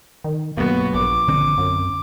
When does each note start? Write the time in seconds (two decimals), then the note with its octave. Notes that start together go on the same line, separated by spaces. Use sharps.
0.24 D#3
0.57 B1 G2 A#3 B3 F#4
0.94 A#1 D6
1.28 D3 C4
1.58 F#2